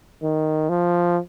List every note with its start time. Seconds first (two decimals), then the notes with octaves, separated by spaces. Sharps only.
0.23 D#3
0.69 F3